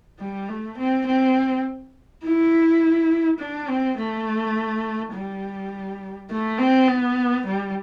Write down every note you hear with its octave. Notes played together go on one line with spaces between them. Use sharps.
G3
A3
C4
C4
E4
D4
C4
A3
G3
A3
C4
B3
G3